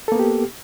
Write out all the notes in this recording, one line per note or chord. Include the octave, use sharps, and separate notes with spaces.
A#3 B3 G4 A4